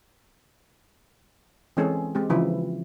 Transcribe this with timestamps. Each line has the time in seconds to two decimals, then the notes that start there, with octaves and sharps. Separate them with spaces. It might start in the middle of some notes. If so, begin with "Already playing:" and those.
1.77 E3 G#3 C4 C#4 G#4 A4
2.15 G#3 C4 G4
2.30 C#3 E3 F3 E4 B4